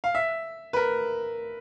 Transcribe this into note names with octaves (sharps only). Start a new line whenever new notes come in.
F5
E5
B4
A#4